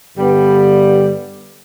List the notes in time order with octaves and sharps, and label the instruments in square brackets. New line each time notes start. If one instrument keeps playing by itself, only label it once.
[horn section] G2 D3 G3 B3